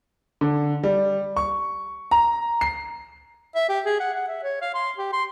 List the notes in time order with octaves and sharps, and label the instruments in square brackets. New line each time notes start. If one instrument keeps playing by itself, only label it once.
[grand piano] D3
G3
C#6
A#5
C7
[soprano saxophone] E5
G4
G#4
F#5
F#5
E5
C#5
F5
C6
G4
C6